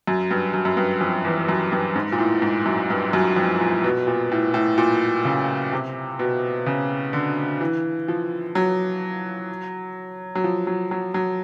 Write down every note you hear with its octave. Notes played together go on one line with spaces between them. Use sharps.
F#2
G2
F#2
F#2
G2
F2
E2
F#2
G2
G#2
A#2
A2
G#2
F#2
G2
F#2
F2
A#2
B2
A#2
A2
A2
A#2
C#3
C3
B2
C#3
D3
E3
F3
F#3
F#3
F3
F#3
F#3
F#3